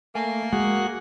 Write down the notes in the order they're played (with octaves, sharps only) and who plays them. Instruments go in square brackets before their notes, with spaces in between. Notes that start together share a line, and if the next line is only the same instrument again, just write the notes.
[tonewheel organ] A3 [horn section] A#3 [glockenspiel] G#5
[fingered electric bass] G#3 [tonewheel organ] F#4 G#4 F#5